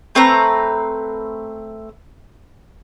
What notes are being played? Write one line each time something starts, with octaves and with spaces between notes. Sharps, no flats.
A3 C4 B4 A#5